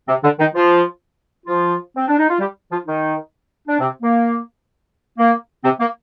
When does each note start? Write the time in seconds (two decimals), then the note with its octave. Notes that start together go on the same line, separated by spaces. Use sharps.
0.07 C3 C4
0.23 D3 D4
0.39 D#3 D#4
0.54 F3 F4
1.46 F3 F4
1.96 C4
2.07 D4
2.18 D#4
2.29 F4
2.39 G3 G4
2.71 F3 F4
2.86 D#3 D#4
3.68 D4
3.79 C3 C4
4.02 A#3
5.18 A#3
5.64 C3 C4
5.80 A#3